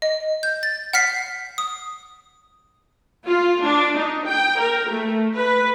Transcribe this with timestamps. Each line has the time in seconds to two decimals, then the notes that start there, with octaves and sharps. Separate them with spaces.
0.02 D#5
0.43 G6
0.63 A6
0.93 F#5 F6 B6 C7
1.58 D#6
3.26 F4
3.62 D4
3.96 D#4
4.27 G5
4.60 A#4
4.91 A3
5.36 B4